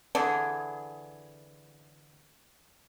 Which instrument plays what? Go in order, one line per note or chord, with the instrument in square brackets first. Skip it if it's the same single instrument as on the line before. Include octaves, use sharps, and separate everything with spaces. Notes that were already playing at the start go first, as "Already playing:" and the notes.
[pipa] D3 E3 G#4